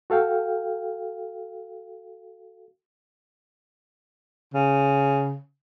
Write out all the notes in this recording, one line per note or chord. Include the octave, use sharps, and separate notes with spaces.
F#4 A4 F5 G5
C#3